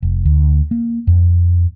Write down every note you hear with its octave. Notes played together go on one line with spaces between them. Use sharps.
F1
D2
A#3
F2